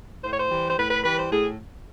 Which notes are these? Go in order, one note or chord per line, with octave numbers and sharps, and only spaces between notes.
A2 C5
C#5
C5
E3 G3
C5
A2 B4
B4
E3 G3 B4
C5
A2 G#4